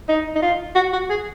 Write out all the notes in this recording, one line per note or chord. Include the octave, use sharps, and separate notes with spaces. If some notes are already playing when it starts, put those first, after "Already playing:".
D#4
D#4
F4
F#4
F#4
G#4